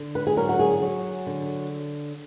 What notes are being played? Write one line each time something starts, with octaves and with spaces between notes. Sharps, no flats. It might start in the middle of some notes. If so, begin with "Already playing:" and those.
Already playing: D3
B4
G#4
F#3 A#4
F#4
G#4
F#3
D3